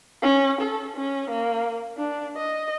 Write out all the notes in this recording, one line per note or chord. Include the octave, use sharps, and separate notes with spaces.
C#4
A4
C#4
A#3
D4
D#5